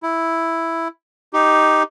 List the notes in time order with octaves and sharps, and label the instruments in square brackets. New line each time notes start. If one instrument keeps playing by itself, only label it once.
[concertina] E4
D#4 G4